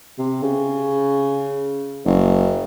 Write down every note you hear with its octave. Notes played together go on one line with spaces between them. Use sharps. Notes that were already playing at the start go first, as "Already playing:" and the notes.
C3
C#3
F#1